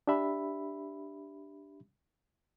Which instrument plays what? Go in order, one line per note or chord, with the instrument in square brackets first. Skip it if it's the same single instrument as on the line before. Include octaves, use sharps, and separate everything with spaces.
[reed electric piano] D4 G4 E5 B5